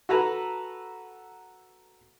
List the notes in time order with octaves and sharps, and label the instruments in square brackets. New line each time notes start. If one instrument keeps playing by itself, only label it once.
[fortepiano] F#4 A4 B4 A#5